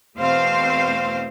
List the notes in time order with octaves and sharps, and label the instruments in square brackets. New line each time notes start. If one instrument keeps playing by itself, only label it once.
[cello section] E2 B2 A3 C4 C5 F5